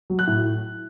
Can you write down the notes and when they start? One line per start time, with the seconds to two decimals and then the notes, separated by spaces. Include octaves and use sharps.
0.10 F#3
0.19 F#6
0.27 A2